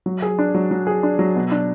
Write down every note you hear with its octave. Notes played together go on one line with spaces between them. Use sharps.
F#3
G#4
D4
F#3
F#3
G#4
D4
F#3
B2
D4